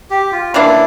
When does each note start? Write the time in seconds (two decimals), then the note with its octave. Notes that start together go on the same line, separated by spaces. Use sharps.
0.10 G4
0.32 F4
0.54 C#3 E3 A#3 D4 E4